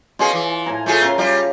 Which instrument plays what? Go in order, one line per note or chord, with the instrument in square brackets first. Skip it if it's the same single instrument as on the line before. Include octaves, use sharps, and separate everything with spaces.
[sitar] B2 C#4 G#4 [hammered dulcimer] F4
[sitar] E3
[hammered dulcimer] A2 G#5 A#5
[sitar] A3 F4 G#4
[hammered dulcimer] C#3 A#4 F5
[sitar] G3 F4